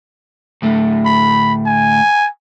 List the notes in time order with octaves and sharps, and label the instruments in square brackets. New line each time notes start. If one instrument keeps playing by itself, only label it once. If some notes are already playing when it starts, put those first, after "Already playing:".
[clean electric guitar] D2 A2 A3
[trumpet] B5
G#5